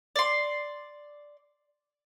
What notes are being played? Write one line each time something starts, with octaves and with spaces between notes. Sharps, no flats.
D5 C6